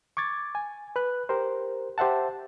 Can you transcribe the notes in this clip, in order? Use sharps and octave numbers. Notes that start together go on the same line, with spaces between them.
C#6 D6 G#6 A6
G#5
B4 F#6
G4 A#4 C5
G4 C5 E5 F#5 A5